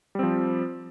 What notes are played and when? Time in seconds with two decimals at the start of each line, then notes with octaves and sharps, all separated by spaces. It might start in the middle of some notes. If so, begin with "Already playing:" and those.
0.15 G3
0.19 C4
0.23 F3